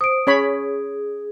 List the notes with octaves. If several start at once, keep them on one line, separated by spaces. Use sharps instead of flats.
C5 D#6 D7
C#4 G#4 C#5 B5